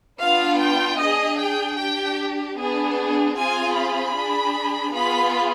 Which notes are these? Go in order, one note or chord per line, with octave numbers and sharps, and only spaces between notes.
B3 D4 F4 F5
G5
D4 G#4 D#5
G5
D4 G4 G5
B3 D4 G#4
C4 F4 G#4 G#5
B5
D4 G#4
B3 F4 G#4 B5